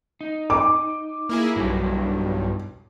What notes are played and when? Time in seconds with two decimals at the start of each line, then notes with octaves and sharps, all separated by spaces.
0.21 D#4
0.50 D6
1.29 A#3 E4 G#4
1.56 B1 G2 F#3 G3 E4